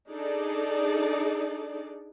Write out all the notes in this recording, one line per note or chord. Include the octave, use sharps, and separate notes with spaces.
D4 D#4 G#4 A4 D5